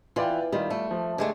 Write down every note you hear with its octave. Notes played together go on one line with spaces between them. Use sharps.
E3 F4 D5 G5
D#3 G3 F4
A3
F3
D3 G#3 A3 G4